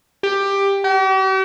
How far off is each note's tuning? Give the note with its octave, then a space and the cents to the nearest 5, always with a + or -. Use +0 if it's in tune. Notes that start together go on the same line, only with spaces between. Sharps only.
G4 +10
G4 -45